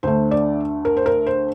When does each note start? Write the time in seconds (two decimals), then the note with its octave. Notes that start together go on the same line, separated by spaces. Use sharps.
0.03 D2 D3 A3 C5
0.31 D5
0.85 A#4
0.97 C5
1.06 A#4
1.27 C5